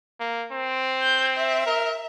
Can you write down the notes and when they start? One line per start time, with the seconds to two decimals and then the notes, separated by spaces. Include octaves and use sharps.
0.20 A#3
0.52 C4
1.02 G6
1.37 E5
1.66 A#4